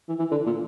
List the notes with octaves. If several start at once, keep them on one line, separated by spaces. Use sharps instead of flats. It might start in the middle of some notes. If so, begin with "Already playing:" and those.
E3
E3
D3
A#2